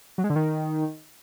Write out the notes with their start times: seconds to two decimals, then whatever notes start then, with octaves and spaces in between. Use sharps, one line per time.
0.18 F#3
0.24 G#3
0.30 D3
0.36 D#3